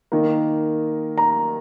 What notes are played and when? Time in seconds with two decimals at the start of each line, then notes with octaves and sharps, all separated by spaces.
0.12 D#3 A#3
1.18 A#5